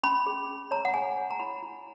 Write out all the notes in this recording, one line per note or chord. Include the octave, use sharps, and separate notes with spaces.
C#4 B5
G#4
C#4
C#5 A#5
F#5
G#4 G#5
C#5
A#5
E4 B5
E4